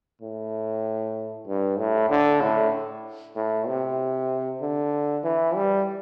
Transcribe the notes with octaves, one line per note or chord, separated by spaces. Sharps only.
A2
G2
A2
D3
A2
A2
C3
D3
E3
G3